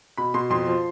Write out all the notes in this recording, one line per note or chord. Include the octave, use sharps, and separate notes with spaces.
B2 B5
B2 C6
F2 C6
F3